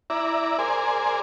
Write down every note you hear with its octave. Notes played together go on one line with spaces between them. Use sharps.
E4 D5 A#5
G#4 A#4 C5 D5 G#5